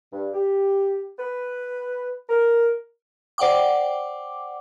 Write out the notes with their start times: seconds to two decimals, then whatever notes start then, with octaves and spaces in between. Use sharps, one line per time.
0.12 G2
0.33 G4
1.19 B4
2.29 A#4
3.38 C5 D5 F#5 G5 D6